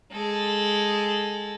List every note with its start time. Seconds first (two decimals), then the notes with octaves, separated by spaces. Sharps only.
0.12 G#3 A4